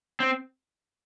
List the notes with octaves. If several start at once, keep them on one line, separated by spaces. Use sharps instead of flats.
C4